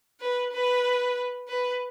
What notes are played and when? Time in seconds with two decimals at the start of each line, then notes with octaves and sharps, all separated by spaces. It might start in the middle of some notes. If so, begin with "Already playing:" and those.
0.21 B4
0.53 B4
1.48 B4